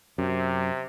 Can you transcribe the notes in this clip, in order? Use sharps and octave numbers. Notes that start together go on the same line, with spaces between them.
F#2 C3